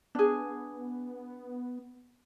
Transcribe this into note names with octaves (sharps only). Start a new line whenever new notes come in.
B3 D4 G#4